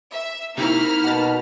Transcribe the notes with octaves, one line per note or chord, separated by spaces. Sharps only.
E5
C3 A#3 D#4 E4 B5 F6
B2 F#5 A5